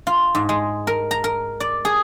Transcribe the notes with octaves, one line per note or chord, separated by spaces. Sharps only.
F4
G#2
G#3
A#4
A#5
A#4
D5
G#4